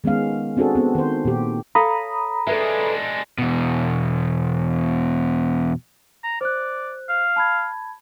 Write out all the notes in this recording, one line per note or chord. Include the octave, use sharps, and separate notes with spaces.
D#3 G#3 B3 C#4 F5
C4 D4 F#4 G#4 A4
B3 C4
D#3 C5
A#2 D#3 G4
A4 C#5 F5 A#5 B5 D#6
G#3 D4 A4 B4 E5
E2 B2
A#5
C5 D5 F#6
F5
A5 B5 G#6